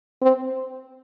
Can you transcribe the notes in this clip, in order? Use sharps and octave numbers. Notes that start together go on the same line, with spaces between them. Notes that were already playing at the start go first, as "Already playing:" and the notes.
C4